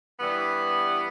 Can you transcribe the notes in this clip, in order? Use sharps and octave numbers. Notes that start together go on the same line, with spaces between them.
G2 E3 G3 B3